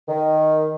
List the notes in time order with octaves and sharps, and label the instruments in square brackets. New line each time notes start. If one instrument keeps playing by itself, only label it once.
[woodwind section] D#3